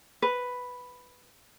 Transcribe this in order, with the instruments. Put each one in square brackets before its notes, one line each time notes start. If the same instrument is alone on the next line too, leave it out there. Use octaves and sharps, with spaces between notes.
[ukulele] B4